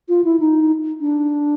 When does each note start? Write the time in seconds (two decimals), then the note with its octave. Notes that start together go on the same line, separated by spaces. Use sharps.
0.09 F4
0.24 E4
0.40 D#4
1.01 D4